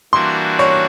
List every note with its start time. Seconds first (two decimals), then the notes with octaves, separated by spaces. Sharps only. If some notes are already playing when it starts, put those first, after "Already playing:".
0.13 E3 G3 A#3 D4 F#4 C6
0.59 C#5